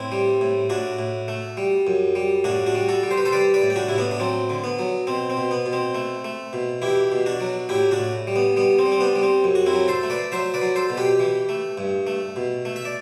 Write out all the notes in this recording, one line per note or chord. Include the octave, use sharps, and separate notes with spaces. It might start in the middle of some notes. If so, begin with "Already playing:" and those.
Already playing: A2 C4 E4
G3
A2
A2 D4 F#4
A2
A3
G3
F#2
G3
A2 D4 F#4
D4 F#4
G3
F#4 A4
G3
C5
B4
A4 C5
G3 B4 D5
B4 D5
A2
G4
D4 F#4
A2 E4
B3 D4
D4
F#3 C4
D3
B3
F#3
B2 C4
C4
B2
B3
B2
C4
A3
A3
B2
E2 E4 G4
B2
D4 F#4
F#3
A2 E4 G4
D4 F#4
A2
G3
B3
G3 B3
C4
G3
C4
B3 D4
G3
C4
F#2
F#4
C4 E4
F#3
A4 C5
A3
B4 D5
F#3 C5 E5
B4 D5
F#3
A4 C5
B2
G4 B4
E3
A3
G2
A3
B2
A3
E5
D5